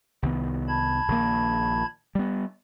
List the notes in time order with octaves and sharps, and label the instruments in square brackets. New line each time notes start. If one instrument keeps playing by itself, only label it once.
[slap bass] C2 D#3 B3
[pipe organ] A5 B5 G#6
[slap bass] A#1 D#3 A#3
G3 B3